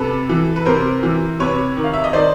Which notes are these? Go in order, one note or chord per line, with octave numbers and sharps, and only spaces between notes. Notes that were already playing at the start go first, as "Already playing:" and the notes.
Already playing: C3 A4 B4
E3
B4
C3 A#4 C5
E3
C3 B4 C#5
D#3
F5
E5
D#5
D#3 C5 D5